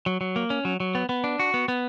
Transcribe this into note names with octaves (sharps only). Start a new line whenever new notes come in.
F#3
F#3
A#3
C#4
F#3
F#3
B3
B3
D4
F#4
B3
B3